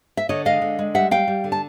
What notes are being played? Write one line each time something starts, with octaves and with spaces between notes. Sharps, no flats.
E5
D3 C#5 D#5
G#3 D#5 F5
D3
G#3
G3 E5 F#5
G3 F5 G5
G3
D3
A5